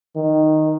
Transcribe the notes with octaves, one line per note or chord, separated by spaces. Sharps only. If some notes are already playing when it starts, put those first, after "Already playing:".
D#3